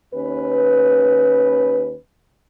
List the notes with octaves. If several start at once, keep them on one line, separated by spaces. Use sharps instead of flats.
D#2 C#4 B4